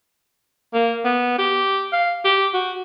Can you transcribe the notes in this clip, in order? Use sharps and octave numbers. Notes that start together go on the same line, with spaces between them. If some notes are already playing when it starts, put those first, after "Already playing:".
A#3
B3
G4
F5
G4
F#4